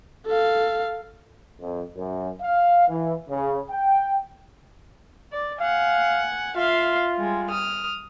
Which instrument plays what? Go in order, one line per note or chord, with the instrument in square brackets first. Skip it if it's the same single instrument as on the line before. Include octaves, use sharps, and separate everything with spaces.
[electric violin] A4 F5
[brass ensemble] F2
F#2
F5
E3
C#3
G5
[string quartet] D5
[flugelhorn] F5 [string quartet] F#5 G#5
[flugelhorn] F4 [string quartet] E5 F5 C6
[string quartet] G3 G#3
D#6 F6